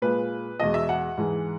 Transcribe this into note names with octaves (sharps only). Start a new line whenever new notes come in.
A#2 G#3 B4
E2 B2 G#3 D#5
E5
F#5
G#2 E3 G#3